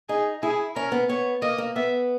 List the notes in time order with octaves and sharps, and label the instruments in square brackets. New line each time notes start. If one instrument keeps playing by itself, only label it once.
[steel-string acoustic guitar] D#4 [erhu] G#4
[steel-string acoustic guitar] E4 [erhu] G#4
[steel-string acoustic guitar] C#4 [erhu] A#4
[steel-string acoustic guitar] B3
[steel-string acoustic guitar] B3 [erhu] C#5
[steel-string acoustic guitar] A#3 [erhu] D#5
[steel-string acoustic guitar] A#3
[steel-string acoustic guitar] B3 [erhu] E5